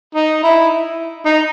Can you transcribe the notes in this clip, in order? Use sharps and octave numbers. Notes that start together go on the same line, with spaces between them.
D#4
E4
D#4